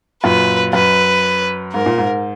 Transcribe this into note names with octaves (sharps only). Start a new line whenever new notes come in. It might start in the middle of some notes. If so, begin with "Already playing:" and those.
F#2 A#2 B4
F#2 B4
G#2 A#4
A#2
G#2